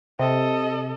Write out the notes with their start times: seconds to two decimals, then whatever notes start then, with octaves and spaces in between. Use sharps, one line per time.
0.19 C3 A4 D#5